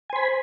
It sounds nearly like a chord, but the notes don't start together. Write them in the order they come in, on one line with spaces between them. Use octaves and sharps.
G#5 C5 B5